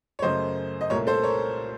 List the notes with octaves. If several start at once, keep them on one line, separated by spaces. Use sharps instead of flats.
C#5
F#2 C#3 A3 C5 D#5
D#5
C2 A#2 A3 A#4 C#5
A4 C5
A#4 C#5